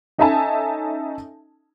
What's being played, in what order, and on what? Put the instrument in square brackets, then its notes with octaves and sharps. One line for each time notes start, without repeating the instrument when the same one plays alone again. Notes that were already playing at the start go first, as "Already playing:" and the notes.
[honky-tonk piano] C#4 D#4 A4 E5 G#5 A5